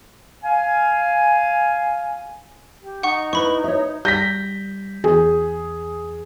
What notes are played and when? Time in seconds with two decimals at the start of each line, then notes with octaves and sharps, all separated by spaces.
0.43 F5 G#5
2.83 G4
3.03 D#4 F#5 C#6
3.33 E4 B4 B5 C#6
3.64 C#5 E5
4.05 G3 G6 A#6 B6
5.04 E2 G#4